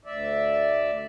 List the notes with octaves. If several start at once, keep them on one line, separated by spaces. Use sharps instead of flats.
D2 D5 E5